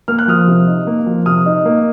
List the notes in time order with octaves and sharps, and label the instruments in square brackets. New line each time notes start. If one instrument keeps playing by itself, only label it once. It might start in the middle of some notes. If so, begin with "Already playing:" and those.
[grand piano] A#3 F6
F#6
F3 D#6 F6
C3
D#4
A#3
F3
C3 D#6 F6
D#4
A#3